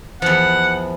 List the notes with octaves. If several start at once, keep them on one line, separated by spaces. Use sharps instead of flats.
E2 F3 F#5